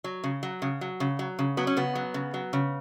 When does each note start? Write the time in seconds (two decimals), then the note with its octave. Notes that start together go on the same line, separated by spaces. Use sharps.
0.04 F#3
0.24 C#3
0.43 F#3
0.62 C#3
0.81 F#3
1.00 C#3
1.19 F#3
1.39 C#3
1.57 F#3 B3
1.67 C#4
1.77 C#3 B3
1.95 F#3
2.14 C#3
2.34 F#3
2.53 C#3